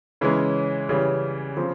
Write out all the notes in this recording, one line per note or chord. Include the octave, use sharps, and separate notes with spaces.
C#3 E3 G#3 C#4
C#3 E3 G3 C#4
C#3 F3 C4